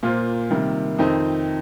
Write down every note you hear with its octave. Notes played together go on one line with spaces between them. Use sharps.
A#2 A#3 F4 C5
C3 D#3 G3 A#3
F2 D#3 C4 D#4